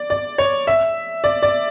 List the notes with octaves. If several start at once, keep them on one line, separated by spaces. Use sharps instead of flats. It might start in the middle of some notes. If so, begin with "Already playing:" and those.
Already playing: D5
D5
C#5
E5
D5
D5